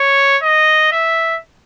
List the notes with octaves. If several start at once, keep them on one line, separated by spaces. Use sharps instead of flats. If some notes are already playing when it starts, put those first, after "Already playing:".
Already playing: C#5
D#5
E5